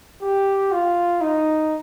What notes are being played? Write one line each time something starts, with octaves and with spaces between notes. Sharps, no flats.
G4
F4
D#4